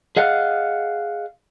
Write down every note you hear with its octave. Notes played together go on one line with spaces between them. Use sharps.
G#4 D#5 F5 F#5